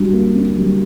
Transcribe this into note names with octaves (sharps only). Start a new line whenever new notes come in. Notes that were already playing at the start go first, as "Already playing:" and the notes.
Already playing: G3 D4 F#4
A#3
D4
G3